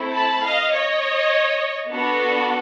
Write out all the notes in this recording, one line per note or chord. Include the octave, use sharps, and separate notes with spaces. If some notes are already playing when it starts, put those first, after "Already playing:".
Already playing: A3 C4 E4 A4
A5 B5
D#5 F5
C#5 D#5
B3 D4 F#4 A4